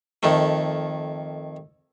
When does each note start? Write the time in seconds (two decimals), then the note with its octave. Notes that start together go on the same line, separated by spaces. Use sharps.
0.23 F2 D#3 A3